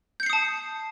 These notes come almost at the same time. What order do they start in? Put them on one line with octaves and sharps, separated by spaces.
G6 C#7 C7 D#6 A5